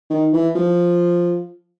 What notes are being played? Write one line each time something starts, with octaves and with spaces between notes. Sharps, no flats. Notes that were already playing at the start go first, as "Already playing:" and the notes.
D#3
E3
F3